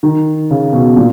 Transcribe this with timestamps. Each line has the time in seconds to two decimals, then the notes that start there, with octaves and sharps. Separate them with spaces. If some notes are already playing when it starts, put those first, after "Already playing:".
0.03 D#3
0.50 C#3
0.73 B2
0.97 A#2